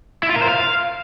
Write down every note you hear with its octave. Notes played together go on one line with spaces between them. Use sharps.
E4
F4
A#4
C5
F5